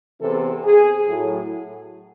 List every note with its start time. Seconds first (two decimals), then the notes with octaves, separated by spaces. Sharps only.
0.20 E2 C3 E3 A4
0.64 G#4
1.07 A2 F#3